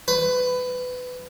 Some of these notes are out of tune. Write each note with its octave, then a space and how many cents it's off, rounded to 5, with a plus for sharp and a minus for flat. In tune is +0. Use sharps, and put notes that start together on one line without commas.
B4 +20